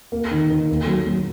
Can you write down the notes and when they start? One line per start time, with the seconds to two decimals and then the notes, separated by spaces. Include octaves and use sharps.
0.12 A#3
0.31 D#3
0.50 D#3
0.69 A#3
0.87 F#3
1.07 F#3